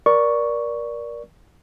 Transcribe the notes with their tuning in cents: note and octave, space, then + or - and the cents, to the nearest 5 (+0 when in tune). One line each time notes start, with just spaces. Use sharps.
A#4 +25 D5 -5 C#6 +5